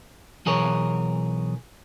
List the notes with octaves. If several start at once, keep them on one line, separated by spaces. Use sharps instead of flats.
B1 E3 G#4 A#4 C#5